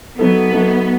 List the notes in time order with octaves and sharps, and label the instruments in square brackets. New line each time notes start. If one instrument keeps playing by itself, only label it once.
[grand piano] F#3 A3 D#4 A4 [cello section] B3
[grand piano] F#3 A3 D#4 A4